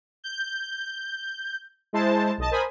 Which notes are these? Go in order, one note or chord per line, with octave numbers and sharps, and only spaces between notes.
G6
G#3 E4 C5 A5
B1 D#5 A5
A#4 C5 G#5 B5 D#6